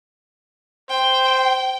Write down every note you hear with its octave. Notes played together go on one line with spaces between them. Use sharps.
C5 G5